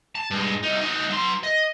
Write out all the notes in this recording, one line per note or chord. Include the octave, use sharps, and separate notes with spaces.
A5
G2 G#3
C2 D#4
D#4 F#4
F#3 C6
D#5